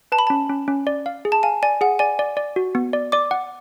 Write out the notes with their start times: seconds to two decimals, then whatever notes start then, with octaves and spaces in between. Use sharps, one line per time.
0.12 B4 A5
0.19 B5
0.27 C#4 A5
0.50 C#4
0.68 C#4
0.87 D5
1.06 F5
1.25 G#4
1.32 A5
1.43 F5 G#5
1.63 D5 G#5
1.81 G#4 F#5
1.99 D5 G#5
2.19 D5
2.37 D5
2.56 F#4
2.75 B3
2.93 D5
3.12 D5 D6
3.31 F#5